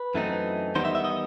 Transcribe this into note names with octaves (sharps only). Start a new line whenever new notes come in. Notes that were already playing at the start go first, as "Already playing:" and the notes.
Already playing: B4
F#2 E3 A3 C4 D#4
E2 D#3 G3 B3 D#4 C5
E5
E5
D#5